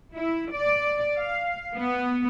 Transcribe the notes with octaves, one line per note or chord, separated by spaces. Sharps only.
E4
D5
F5
B3